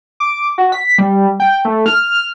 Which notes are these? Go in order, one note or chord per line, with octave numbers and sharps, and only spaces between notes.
D6
F#4
B6
G3
G5
A3
F6
F6